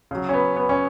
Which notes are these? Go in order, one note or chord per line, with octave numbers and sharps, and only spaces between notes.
C#3 F#3
C#4
B3
B3
C#4